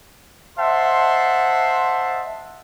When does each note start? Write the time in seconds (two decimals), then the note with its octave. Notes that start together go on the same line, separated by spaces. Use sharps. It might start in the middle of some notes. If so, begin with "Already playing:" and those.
0.58 C5 D#5 E5 F#5 A5 C6